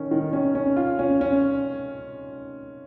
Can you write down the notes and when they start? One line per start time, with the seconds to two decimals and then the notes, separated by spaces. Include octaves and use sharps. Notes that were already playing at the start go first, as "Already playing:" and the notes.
Already playing: D#3 C#4
0.11 D#3
0.33 C#4
0.55 C#4
0.77 F4
0.99 C#4
1.21 C#4